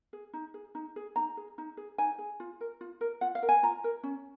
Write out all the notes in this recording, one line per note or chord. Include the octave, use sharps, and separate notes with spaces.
G#4
D#4
G#4
D#4
G#4
D#4 A#5
G#4
D#4
G#4
D#4 G#5
G#4
F4
A#4
F4
A#4
F4 F#5
F5
A#4
G#5
F4 A#5
A#4
C#4